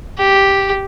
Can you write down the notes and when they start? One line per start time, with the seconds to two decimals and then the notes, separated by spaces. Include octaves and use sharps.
0.19 G4